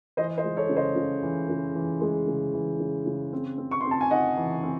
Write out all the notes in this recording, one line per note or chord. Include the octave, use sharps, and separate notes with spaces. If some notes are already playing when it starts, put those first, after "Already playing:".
E3 C5 D#5
C5 D#5
G#3
A4 C#5
C#3
C5 D#5
C#3
E3
C#3
E3
G#3
C#3
E3
C#3
C#3
C4
C4
C#6
C4 C6
A5
G#5
D#4 D#5 F#5
E3
C4